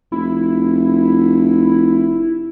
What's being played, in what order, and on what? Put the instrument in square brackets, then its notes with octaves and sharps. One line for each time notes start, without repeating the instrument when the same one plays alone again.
[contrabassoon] F1 [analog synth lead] E4